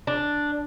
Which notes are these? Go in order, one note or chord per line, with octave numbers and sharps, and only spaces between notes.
D4